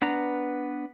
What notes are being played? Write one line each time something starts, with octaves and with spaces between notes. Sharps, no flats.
B3 D4 B4 A#5